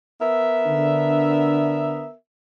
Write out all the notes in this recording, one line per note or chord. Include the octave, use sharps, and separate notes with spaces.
B3 A#4 E5
D3 D4